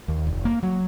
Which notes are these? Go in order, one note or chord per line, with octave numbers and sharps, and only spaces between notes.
D#2
F1
A#3
F#3